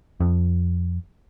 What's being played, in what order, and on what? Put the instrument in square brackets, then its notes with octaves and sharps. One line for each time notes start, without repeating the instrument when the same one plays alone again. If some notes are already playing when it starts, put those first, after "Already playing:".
[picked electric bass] F2